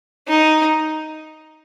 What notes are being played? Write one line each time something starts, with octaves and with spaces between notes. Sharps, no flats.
D#4